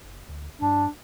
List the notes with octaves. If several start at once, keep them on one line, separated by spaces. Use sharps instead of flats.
F#1
D2
G2 D4